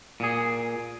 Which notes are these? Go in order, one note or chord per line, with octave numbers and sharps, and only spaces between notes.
A#2 G#4